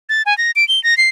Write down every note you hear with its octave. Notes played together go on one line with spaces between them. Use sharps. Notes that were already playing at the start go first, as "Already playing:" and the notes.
A6
G#5
A#6
D7
G7
A#6
C7